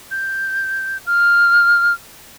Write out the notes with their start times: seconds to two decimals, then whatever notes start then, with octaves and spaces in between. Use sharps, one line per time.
0.11 G6
1.07 F6